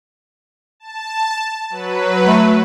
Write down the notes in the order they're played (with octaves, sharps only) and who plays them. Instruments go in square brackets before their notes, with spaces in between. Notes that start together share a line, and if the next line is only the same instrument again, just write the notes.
[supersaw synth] A5
F#3 B4
[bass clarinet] A3